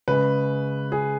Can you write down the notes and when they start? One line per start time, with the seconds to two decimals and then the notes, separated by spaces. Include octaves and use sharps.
0.08 C#3 G#3 B4
0.92 G#4